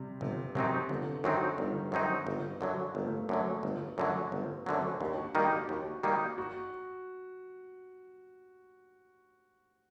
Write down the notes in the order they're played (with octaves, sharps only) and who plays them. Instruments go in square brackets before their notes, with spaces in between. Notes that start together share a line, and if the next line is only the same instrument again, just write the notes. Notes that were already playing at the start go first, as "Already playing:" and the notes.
Already playing: [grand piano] C3 G3
[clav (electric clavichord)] G1 [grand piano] C3
[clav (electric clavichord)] F#2 F#3 C4 D#4 [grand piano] C3
[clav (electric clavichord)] G1 [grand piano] D3
[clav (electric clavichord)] F#2 F#3 C4 D#4 [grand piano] D#3
[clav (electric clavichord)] G1 [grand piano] G3
[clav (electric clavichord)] F#2 F#3 C4 D#4
G1
F#2 D3 F#3
[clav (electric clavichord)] G1 [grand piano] A#3
[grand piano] A3
A#3
[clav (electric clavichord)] F#2 D3 F#3
G1
F#2 D3 F#3
[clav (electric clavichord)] G1 [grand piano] C4
[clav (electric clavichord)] F#2 D3 F#3 [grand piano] C4
[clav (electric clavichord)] D#2 [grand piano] D4
[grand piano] F#4
[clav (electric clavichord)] D#3 G3 A#3 D#4 [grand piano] F#4
[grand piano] G4
[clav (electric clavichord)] D#2 [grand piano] F#4
[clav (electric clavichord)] D#3 G3 A#3 D#4
[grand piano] F#4